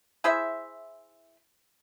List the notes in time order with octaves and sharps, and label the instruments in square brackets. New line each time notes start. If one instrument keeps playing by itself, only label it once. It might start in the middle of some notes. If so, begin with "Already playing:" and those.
[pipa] E4 G#4 C5 E5